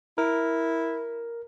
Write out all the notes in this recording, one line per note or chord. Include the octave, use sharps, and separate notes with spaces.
E4 A#4